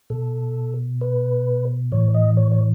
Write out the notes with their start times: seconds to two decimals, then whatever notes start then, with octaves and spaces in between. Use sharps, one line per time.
0.10 B2 A4
1.01 B4
1.92 A2 E3 C#5
2.14 D#5
2.37 C#5
2.52 C#5